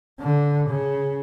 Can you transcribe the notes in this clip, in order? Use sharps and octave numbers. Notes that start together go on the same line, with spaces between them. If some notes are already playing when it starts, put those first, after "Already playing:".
D3
C#3